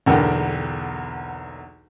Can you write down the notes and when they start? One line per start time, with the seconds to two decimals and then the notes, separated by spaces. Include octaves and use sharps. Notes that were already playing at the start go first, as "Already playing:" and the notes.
0.06 B1 E2 D3 A#3 G5 A#5